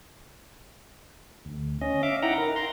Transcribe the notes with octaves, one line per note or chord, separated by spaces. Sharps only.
D2
C#4 D#5
E5 F5 D6
D#4 E4 F#5 G5 A#5
A#4
A#5 C6